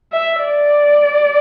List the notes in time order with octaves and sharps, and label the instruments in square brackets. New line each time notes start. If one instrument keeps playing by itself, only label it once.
[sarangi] E5
D5